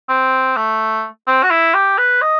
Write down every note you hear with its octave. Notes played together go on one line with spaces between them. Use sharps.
C4
A3
C4
F#4
E4
G4
B4
D#5